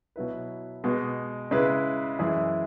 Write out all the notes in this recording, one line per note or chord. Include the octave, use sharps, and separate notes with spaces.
B2 F#3 E4 B4
B2 G#3 B3
C#3 G#3 E4 G#4 B4
F#2 E3 G#3 E4 G#4